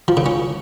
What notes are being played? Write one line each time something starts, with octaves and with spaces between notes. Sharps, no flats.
F3
C#3
C#4